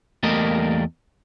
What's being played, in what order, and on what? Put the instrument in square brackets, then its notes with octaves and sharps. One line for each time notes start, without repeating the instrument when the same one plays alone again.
[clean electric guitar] E2 G3 A3 A#3 A#4 D#5